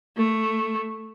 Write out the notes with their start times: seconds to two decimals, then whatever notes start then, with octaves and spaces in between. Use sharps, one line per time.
0.18 A3